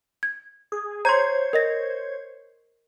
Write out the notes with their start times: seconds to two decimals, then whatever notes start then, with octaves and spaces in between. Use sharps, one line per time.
0.23 G#6
0.72 G#4
1.05 C5 C#5 A#5 C6 G#6
1.53 A#4 D#5 A#6